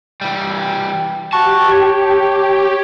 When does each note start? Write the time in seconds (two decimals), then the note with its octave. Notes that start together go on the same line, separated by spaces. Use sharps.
0.21 E3 G3
1.33 F#4 G4 A5 C#6
1.71 C#5